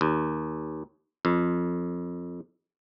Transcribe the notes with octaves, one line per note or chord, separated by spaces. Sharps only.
D#2
F2